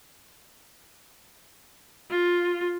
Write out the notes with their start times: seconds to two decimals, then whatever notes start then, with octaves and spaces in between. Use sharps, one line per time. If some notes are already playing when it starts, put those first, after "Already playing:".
2.10 F4